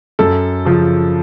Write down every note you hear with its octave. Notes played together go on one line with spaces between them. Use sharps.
F#2 A4
C#3 F3